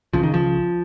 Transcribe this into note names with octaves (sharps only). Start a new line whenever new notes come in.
C#2 C#3 F3
D#3
F3